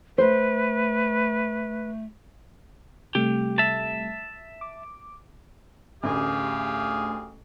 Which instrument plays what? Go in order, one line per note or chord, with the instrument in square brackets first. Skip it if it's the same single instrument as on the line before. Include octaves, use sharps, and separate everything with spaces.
[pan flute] A3 [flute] B4 [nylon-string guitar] C5
[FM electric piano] C3 G3 A3 [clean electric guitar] G4
[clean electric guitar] E5 A5
[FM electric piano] D6
[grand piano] A1 D2 [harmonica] G4 G#4 F5